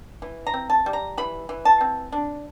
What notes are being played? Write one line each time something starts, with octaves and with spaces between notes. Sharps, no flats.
E3
A#5
C4
A5
G3
A#5
E3 B5
E3
A5
C4
D4